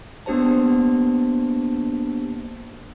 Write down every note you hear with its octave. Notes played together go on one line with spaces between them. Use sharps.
A#3 B3 D4 G4 C5 A5